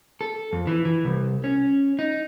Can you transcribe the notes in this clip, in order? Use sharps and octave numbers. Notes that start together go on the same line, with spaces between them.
A4
F2
E3
E3
C2
C#4
D#4